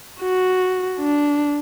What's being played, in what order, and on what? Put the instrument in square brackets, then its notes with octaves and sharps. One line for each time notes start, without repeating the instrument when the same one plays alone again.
[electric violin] F#4
D4